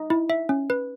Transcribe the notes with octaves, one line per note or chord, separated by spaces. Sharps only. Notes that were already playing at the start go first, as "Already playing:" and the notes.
Already playing: D#4
E4
E5
C#4
B4